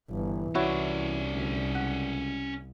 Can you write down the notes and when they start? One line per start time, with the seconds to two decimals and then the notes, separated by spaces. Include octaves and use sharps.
0.10 G1 E3
0.55 C2 C#4 E4 F#4 C#5 D5
1.33 D2
1.75 C#2 F#5